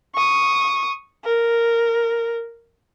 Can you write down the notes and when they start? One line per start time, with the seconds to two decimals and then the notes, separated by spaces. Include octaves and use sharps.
0.16 C#6 D#6
1.24 A#4